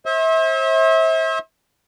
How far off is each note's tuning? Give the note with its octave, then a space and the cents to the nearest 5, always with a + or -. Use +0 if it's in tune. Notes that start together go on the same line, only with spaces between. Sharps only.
C5 +40 E5 -30